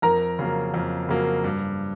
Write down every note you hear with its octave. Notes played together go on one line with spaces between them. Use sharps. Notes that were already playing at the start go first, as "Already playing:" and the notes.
F2 A#4 A#5
C#3 F#3 A#3
F2
C#3 F#3 A#3
G2